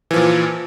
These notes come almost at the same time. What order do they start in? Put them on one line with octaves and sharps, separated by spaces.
E3 F3 A#2